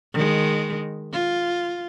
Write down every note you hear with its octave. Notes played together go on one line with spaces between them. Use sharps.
D#3 G#3
F4